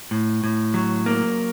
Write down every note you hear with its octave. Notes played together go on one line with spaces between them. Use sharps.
A2
A2
F#3
A#3